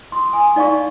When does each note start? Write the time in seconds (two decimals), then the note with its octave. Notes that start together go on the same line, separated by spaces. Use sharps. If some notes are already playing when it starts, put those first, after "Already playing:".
0.12 C6 D#6
0.33 G#5 D#6
0.56 D#4 D5 F5 A5 C#6